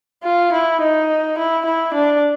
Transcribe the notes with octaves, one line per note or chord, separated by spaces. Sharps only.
F4
E4
D#4
E4
E4
D4